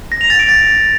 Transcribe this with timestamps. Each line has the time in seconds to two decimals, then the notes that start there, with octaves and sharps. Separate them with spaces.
0.12 A#6
0.21 F7
0.30 A6
0.39 D7
0.48 A6